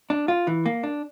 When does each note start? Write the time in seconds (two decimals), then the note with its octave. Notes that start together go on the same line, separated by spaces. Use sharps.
0.10 D4
0.28 F4
0.47 E3
0.66 A#3
0.83 D4